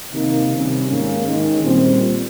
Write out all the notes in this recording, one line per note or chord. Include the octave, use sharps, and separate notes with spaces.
C3 D#3 A#3 D#4
C3 G3 C#4
G#2 D#3 A#3 C#4
D#3 G#3 C#4
A#2 G3 C4